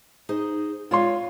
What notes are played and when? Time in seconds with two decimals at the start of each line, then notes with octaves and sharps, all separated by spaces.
0.29 D#4 G#4 C5
0.91 G#3 F4 C#5 D5 C6